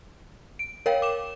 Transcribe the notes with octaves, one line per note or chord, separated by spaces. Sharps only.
D7
A#4 C#5 F5 G5
D6 E7